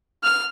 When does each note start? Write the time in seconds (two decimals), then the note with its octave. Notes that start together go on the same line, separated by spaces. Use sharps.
0.23 F6